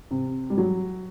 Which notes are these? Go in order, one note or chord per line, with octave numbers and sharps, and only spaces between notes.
C3
G3
F#3